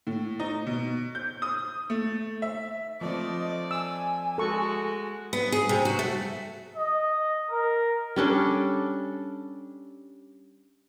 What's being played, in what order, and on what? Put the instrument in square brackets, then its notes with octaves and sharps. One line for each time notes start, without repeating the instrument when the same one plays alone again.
[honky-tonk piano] A2
D#4
B2
G6
D#6
A3
E5
[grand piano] F3 A3 C4 [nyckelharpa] D5 [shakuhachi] D#5
[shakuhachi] G#5 [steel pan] E6
[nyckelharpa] G#3 F#4 [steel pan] A4 C#6
[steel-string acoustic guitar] B3
G#4
C3
F#4
A3
[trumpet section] D#5
A#4
[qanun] G3 C#4 D4 A4